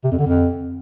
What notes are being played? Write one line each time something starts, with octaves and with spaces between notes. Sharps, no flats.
C3
F2
D3
F2